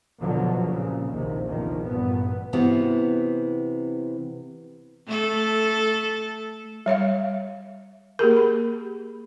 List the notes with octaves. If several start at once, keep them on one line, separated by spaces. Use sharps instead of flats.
E2 B2 D3 F3 F#3
C2 A#2 C#3
A#1 D#2 C3
A#1 E2 D#3 F3
A1 G2 A#2 B3
C3 E3 B3 F#4
A3 A4
G3 C#5 E5 F5
A#3 G4 G#4 A#4
B5